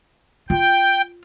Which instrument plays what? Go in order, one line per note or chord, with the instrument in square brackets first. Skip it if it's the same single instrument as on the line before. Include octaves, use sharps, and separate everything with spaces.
[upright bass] F4 [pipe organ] G5